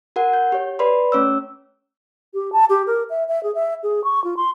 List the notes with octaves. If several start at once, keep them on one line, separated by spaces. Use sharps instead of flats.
F#4 A#4 F#5
G6
G4 C#5
B4 D5 B5 C6
A3 C#4 C#5 E6
G4
A5
G4
A#4
E5
E5
G#4
E5
G#4
C#6
F4
C6